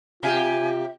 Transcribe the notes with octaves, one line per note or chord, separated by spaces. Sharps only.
C3 F4 G4 E5 G#5